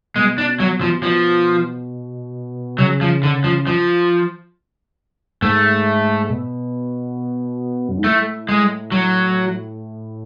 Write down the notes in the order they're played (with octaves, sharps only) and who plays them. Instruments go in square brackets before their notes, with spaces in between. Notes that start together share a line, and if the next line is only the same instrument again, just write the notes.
[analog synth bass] B2 [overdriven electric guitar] G#3
[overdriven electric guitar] D4
F#3
F3
[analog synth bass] B2 [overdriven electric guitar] F3
[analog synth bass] C#3 [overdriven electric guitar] F#3
[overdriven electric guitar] F3
D3
F3
F3
[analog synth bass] G#2 [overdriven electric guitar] A3
[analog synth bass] B2
F#2
G#2
[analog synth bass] A2 [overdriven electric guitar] A3
[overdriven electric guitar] G#3
F#3